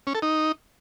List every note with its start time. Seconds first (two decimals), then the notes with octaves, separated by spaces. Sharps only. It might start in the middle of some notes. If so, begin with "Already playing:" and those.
0.07 C#4
0.15 A4
0.22 D#4